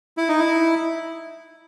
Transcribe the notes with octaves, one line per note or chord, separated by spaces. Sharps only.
E4
D#4
E4